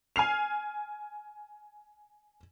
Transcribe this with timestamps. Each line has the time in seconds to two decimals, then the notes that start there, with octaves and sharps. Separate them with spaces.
0.16 G#5 F6 C7 F7